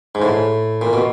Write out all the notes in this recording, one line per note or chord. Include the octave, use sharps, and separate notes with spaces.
G#2
A2
A#2
B2